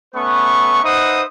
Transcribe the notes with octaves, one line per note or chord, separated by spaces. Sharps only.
A3 B3 C#4 B4 C#6
D#4 B4 C5 E5 F#5 D#6